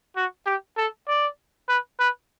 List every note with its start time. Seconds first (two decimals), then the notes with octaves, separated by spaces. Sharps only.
0.16 F#4
0.46 G4
0.77 A4
1.08 D5
1.69 B4
1.99 B4